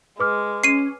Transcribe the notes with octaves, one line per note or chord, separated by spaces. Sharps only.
G#3 B4 D6 F6
C#4 C7 D#7